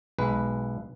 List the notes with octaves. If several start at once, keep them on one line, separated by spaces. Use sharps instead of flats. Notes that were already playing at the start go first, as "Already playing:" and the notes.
B1 G#3 B4